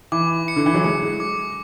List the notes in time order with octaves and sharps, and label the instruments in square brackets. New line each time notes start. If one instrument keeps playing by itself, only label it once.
[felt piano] E3 [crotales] D6
[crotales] C#7
[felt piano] D3
E3
F#3
[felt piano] G#3 [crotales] C#7
[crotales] D6